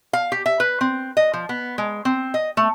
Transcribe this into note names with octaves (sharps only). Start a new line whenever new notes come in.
F5
G4
E5
B4
C4
D#5
F3
B3
G#3
C4
D#5
A3